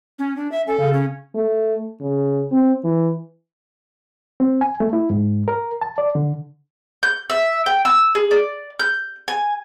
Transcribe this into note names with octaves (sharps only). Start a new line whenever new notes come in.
C#4
D4
E5
C#4 A4
C#3
C#4
A3
C#3
C4
E3
C4
G#5
A3
E4
G#2
A#4
A5
D5
D3
G6
E5
G5
E6
G#4
D5
G6
G#5